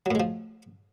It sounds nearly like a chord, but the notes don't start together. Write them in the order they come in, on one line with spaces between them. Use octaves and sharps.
F#3 A2 G#3 F3